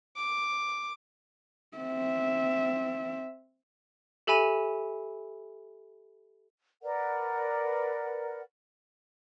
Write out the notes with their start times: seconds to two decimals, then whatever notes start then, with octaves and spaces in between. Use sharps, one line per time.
0.17 D6
1.77 C4 E5
4.27 G4 A4 E5 G#5 B5 D#7
6.83 A#4 B4 D5 F#5